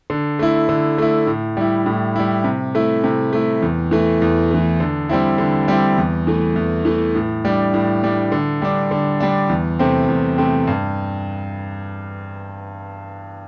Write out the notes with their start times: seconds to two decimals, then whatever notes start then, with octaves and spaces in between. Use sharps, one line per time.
0.10 D3
0.39 A3 E4
0.69 D3
0.98 A3 E4
1.27 A2
1.57 G3 E4
1.86 A2
2.16 G3 E4
2.44 C3
2.75 A3 E4
3.04 C3
3.33 A3 E4
3.62 E2
3.91 E3 A3
4.22 E2
4.51 E3 A3
4.80 D3
5.09 G3 C4 E4
5.38 D3
5.68 G3 C4 E4
5.98 E2
6.27 E3 A3
6.56 E2
6.85 E3 A3
7.15 A2
7.45 G3 D4
7.74 A2
8.04 G3 D4
8.32 D3
8.62 G3 D4
8.91 D3
9.20 G3 D4
9.49 E2
9.79 C3 A3 C4
10.08 E2
10.38 C3 A3 C4
10.67 G2